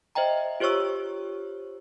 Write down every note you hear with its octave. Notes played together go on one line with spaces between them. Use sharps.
C5 D#5 E5 G5 A#5
F4 G4 C5 C#5 C#6 E6